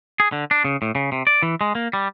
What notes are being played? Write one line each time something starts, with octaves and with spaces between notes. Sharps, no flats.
G#4
D3
D4
C#3
A2
C#3
C3
D5
E3
G#3
A#3
G3